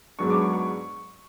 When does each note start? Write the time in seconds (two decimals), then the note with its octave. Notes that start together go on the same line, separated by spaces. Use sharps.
0.19 G#2 F#3 B3 D4 C#6
0.30 D6
0.41 C#6
0.53 C#6